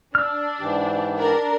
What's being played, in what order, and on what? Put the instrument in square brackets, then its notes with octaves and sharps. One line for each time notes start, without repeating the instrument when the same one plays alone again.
[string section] D4 [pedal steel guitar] E6 F6
[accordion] G#2 E3 G4
[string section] D4 A#4